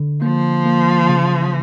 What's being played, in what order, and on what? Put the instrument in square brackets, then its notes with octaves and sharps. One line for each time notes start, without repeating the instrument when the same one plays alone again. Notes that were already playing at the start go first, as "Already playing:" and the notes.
Already playing: [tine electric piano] D3
[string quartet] F3 [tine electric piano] A#3
[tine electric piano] A#3
C#3